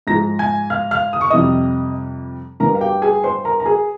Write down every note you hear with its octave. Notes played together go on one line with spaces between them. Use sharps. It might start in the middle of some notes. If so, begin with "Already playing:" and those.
G#2 F3 G#3 A#5 A#6
G#5 G#6
F5 F6
F5 F6
D#6
C#6
F2 C3 G3 D#5 D#6
G2 G3 A#4 A#5
F5
G4 G5
G#4 G#5
C5 C6
A#4 A#5
A#5
G#4 G#5